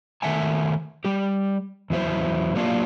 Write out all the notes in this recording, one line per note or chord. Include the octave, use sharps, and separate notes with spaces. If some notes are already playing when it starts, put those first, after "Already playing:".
D#3 A3 E5 F#5 G#5 A5
G3 G4
E2 F#3 E4 C5
F#3 A#3 D4 F4 G4 F5